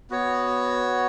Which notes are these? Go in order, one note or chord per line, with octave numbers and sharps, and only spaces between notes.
B3 F#4 C#5